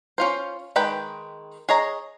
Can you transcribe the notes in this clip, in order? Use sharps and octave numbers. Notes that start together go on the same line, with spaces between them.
C#4 F4 C5
D#3 G#3 B4 G5 B5
G#4 C#5 D#5 A#5